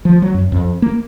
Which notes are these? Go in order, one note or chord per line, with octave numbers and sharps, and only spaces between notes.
F3
F#3
F#2
F2
A#3